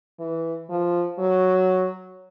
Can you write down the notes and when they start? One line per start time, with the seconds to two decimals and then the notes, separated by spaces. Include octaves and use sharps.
0.20 E3
0.70 F3
1.19 F#3